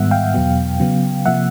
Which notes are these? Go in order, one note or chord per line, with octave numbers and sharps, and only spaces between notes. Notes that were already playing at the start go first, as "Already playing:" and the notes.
Already playing: G#2 D#3 G3 B3 E5 F#5
F5 G5
E2 B2 F#3 B3
C#3 F#3 B3
C3 F3 A#3 E5 F#5